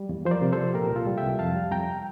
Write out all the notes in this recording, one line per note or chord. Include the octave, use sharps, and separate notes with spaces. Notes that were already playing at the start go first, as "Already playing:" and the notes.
Already playing: G3
E2
F3 C5
A#4 D5
C3
A4 C5
F3
A#2 G4 A#4
C2
F4 A4
G3
E5 G5
C2
F2 F5 A5
G3
F2 G5 A#5